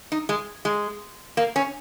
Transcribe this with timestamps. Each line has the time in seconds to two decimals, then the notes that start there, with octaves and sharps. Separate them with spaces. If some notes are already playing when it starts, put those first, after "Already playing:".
0.12 D#4
0.29 G#3
0.65 G#3
1.37 A#3
1.56 C#4